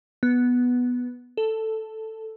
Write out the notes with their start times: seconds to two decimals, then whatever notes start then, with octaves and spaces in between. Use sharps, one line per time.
0.23 B3
1.37 A4